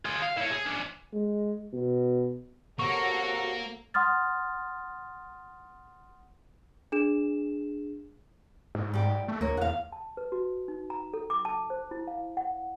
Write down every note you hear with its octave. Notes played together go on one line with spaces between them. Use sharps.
F4 G#4
F5
E4 C#5
G#4
C#4 D4
G#3
B2
C3 F#3 A#3 F#4 A4 C#5 A#5 C#6
F#5 C6 D#6 F6 A6
D4 G#4 E7
G#2
G3 G4
A3
D2 A#3 C#5
E2 F5 F#5
A5
B4
F#4
D#4
A#5
A4
D6
A5
C5
E4
F5
F#5